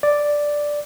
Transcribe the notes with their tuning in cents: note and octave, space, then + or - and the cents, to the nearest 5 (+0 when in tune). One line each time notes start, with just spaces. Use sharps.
D5 +0